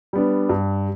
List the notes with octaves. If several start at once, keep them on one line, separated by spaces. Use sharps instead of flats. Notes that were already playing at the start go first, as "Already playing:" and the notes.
G3 B3 D4
G2